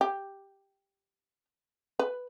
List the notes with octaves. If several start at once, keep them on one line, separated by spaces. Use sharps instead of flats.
G4
B4